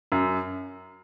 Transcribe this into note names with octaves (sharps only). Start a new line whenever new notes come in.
F#2